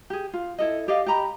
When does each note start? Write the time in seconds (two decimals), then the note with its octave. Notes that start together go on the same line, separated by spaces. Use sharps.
0.10 G4 G#4
0.34 F4
0.58 E4 A4 D#5
0.88 G4 D5 D#5 F5
1.06 G4 D#5 A#5 B5